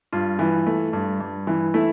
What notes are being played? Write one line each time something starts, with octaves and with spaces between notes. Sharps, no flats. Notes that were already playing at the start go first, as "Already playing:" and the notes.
G2 F4
E3
A3
G2
G2
E3
A3 E4